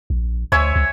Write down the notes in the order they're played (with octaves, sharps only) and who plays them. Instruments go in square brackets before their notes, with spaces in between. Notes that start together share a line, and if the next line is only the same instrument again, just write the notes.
[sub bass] A#1
[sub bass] D2 [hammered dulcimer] C#5 E5 G#5
[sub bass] C#2